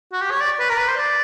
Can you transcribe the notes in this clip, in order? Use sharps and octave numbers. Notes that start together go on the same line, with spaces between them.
F#4
G4
C#5
D5
B4
A#4
B4
C5
D5